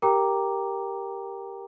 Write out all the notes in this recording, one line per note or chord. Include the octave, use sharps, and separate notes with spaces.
G4 A#4 G5 A#5 D6